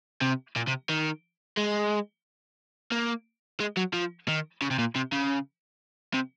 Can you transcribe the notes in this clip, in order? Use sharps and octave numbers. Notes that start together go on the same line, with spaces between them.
C3
A#2
C3
D#3
G#3
A#3
G#3
F#3
F3
D#3
C#3
C3
A#2
C3
C#3
C3